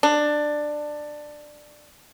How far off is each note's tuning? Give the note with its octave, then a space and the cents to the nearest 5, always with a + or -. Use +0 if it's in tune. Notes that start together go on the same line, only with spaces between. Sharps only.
D4 +15